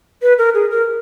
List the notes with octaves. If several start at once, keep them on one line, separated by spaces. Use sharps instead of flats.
B4
A#4
G#4
A#4